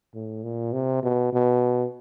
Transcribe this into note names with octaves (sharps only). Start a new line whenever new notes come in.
A2
A#2
C3
B2
B2